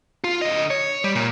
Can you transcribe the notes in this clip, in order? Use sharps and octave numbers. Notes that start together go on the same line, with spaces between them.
F4
D3 D#5
C#5
G3
A#2